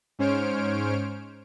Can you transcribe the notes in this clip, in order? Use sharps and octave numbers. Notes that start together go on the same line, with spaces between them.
G#2 C#4 C5 C#5 F6 D7